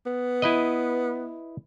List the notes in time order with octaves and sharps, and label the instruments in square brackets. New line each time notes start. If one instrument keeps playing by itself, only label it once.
[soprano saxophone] B3
[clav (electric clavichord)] E4 B4 D#5